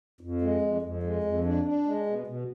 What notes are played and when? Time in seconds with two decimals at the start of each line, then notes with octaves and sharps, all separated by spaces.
0.21 F2
0.42 G#3
0.62 F2
0.82 F2
1.03 G#3
1.24 F2
1.44 D4
1.65 D4
1.86 G#3
2.06 B2
2.27 B2